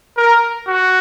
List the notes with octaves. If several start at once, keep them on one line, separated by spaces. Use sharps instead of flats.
A#4
F#4